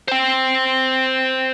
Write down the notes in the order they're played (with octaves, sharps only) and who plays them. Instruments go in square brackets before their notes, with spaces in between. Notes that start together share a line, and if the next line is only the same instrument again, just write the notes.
[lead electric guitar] C5 G5